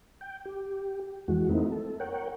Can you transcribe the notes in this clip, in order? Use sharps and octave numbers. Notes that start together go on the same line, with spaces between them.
G5
G4
F2 E3 G#3 F#4
A3 A#3 C4 D#4 E4
A4
A#4 C#5 F#5 G5